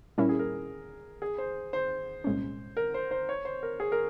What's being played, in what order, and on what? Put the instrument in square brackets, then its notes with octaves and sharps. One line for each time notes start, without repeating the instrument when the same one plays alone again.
[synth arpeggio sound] A#2 G3 C#4 E4 [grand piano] A#4
[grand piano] G#4
A#4
G#4
C5
C5
[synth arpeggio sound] C2 A#2 G#3 C#4
[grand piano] A#4
C5
C5
C#5
C5
A#4
G#4
A#4